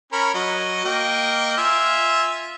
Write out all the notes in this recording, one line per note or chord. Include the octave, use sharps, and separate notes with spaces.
C#4 A#4 B5
F#3 F#4 D#5
A#3 D#5 G5
F4 E5 G#5